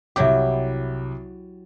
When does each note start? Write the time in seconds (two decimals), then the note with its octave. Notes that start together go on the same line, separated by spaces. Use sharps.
0.16 C2 F#3 E4 G4 D6